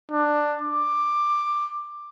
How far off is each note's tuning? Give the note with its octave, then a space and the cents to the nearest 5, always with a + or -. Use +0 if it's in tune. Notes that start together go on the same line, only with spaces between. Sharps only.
D4 +10
D6 +10